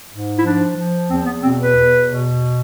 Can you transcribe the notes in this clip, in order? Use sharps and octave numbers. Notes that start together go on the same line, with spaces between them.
G#2
E4
F3 D4
F3
E2 C4
B3
B2 C4
B4
E2
B2